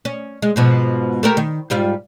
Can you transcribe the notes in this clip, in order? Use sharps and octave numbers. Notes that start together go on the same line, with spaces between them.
C#4
G#3
G#2 B2 F3
A3 G4 A#4
D#3
G#2 G3 F4